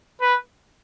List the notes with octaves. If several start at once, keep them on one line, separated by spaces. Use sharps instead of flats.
B4